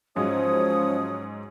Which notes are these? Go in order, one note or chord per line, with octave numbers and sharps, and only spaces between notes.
G#2 F3 F#3 G#3 C#4 C#5 D#6